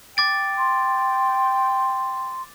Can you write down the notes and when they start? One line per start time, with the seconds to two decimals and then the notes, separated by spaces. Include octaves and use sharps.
0.17 G5 D6 A6 D7
0.58 C6